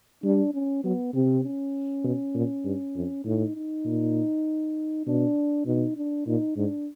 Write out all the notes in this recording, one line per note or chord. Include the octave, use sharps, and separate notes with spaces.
G3 D4
C#4
F#3 B3
C3 C4
C#4
B2
A#2
G2
F2
A2 D#4
D#4
A#2
B2 D4
B2 D#4
D4
A#2 D#4
G#2 D4